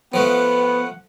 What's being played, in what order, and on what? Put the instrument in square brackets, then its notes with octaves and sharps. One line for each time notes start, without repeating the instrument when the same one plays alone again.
[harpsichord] F3 A3 [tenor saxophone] B3 [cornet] F#5
[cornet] F#5